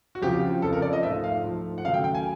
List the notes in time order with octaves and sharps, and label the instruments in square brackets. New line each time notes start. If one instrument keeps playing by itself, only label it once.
[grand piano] F#4
F2 C#3 F3 G4
F2 C#3 F3 A4
A#4
D5
D#5
G#2 F3 A3 E5
F5
G#2 F3 A3
F#5
D#2 C#3 F#3 A3 F5
G5
G5
G#5